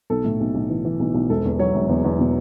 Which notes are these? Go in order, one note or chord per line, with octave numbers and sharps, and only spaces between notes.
B1 A4
A2
B1
B1
E3
E3
B1
B1
E1 A4
E2
F#3 C#5
E1
E2
E2
B2